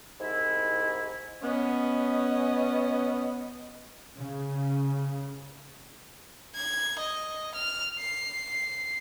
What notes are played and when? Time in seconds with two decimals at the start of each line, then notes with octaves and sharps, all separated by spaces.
0.21 C2 G#2 E4
1.42 B3 C#4 D#5
4.18 C#3
6.56 G#6
6.99 D#5
7.55 F6
8.00 C7